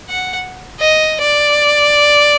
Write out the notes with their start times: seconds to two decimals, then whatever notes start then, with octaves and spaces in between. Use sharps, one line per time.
0.09 F#5
0.80 D#5
1.22 D5